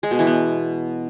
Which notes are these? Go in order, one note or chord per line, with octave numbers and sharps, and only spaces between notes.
G#3
B2
E3
B3